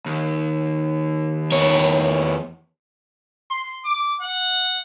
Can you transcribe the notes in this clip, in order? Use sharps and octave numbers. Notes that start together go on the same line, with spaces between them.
D#2
E2 C#5
C6
D6
F#5